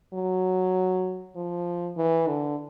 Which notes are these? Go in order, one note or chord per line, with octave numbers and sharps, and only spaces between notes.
F#3
F3
E3
D3